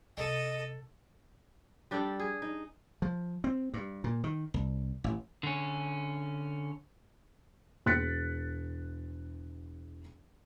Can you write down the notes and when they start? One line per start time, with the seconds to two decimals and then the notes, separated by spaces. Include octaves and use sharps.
0.17 C3 G#3 A4 D#5
1.91 G3 D4 G4 A4
2.20 G#4
2.42 D#4
3.02 F3
3.44 C4
3.74 G2
4.04 A#2
4.24 D#3
4.54 C2
5.04 A1
5.43 D3 C#4
7.86 E1 F#6 A6 B6 C#7